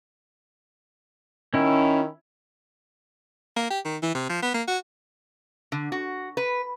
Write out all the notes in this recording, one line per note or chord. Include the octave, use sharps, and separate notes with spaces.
D#3 C#4 E4
A#3
G4
D#3
E3
C3
F3
B3
A#3
F#4
D3
F#4
B4